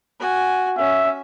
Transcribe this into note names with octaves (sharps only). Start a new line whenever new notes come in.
F#4 G#5
C#4 E5